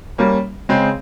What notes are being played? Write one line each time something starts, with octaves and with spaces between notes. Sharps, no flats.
G3 A#3 C#4
C#3 G#3 C4